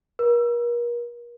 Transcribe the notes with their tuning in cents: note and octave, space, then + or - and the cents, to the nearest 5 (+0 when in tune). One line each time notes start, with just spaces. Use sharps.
A#4 +40